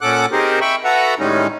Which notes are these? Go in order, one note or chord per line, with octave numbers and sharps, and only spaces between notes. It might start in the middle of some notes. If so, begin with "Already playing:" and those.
A#2 C#4 A4 F#5 D6 F#6
C4 D#4 G4 G#4 A#4 C5
E5 G5 B5 C#6
F#4 A4 B4 E5 F#5 A#5
A2 D#3 G3 G#3 C#4 D#4